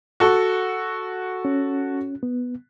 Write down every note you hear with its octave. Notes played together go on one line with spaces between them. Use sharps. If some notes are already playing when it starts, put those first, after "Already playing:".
F#4 A4
C#4
B3